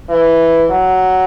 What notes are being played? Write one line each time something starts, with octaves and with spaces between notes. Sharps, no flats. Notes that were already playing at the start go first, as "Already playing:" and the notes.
E3
F#3